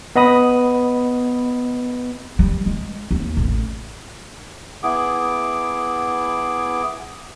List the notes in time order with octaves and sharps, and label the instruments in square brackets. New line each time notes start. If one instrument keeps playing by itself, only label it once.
[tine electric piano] B3 D#5 B5 D#6
[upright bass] G3
G#3
D#2
A1
[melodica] B3 E4 G#4 D6